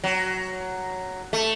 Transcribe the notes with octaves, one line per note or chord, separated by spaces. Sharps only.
F#3
A3